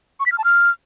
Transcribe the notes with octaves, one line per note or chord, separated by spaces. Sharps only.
C#6
B6
F6
A5
F6